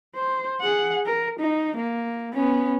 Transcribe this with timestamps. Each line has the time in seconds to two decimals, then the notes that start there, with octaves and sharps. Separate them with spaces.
0.15 C5
0.62 G#4 F#5
1.06 A#4
1.40 D#4
1.77 A#3
2.33 B3 C#4